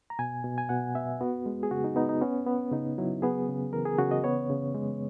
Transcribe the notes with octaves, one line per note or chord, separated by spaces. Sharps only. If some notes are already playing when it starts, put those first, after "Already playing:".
A#5
B2 G#5
B2
G#5
B2 F#5
B3 E5
B3 F#4
G#3
G#4
C#3 F#4
D#4
B3 D#4
D#4
B3 C#4
B3
C#3 D#4
F#3 E4
B3 G#4
C#3
E3 A#4
G#4
C#3 F#4
D#5
B3 C#5
C#3
G#3